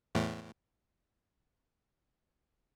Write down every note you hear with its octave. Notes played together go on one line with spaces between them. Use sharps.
E2 A2